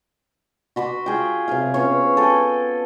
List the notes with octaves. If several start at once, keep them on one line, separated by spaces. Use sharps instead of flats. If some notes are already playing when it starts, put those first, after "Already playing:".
F#4 B5 C6 D6
F4 G#4 G5
C3 F#3 G#4 F5
B3 C#4 F4 C#5
A4 G5 G#5 D6